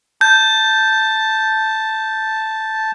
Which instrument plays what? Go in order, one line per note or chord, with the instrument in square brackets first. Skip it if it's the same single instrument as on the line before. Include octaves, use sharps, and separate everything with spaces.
[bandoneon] A5 [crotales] G6